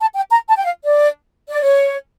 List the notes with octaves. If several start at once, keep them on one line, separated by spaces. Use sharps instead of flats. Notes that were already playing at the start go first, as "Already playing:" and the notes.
A5
G5
A#5
A5
G5
F5
D5
D5
C#5